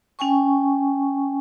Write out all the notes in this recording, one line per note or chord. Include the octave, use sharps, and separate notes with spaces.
C#4 G5 G#5 C#6